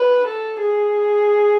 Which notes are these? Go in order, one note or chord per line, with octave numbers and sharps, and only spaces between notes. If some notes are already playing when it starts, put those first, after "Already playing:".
Already playing: B4
A4
G#4